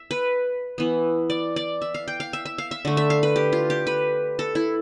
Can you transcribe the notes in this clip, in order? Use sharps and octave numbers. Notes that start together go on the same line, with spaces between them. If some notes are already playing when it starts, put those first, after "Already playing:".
Already playing: E5
B4
E3 B3
D5
D5
E5
F5
G5
F5
E5
E5
F5
E5
D3 A3
E5
F5
B4
G4
F4
G4
B4
A4
E4